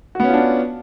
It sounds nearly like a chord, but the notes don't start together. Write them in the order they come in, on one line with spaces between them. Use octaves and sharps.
F#4 B3 C#4 F4 D4